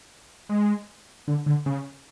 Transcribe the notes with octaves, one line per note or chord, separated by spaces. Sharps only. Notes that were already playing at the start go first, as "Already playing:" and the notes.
G#3
D3
D3
C#3